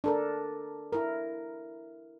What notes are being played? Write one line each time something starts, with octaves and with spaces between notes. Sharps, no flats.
D4 A4 A#4
E4 A#4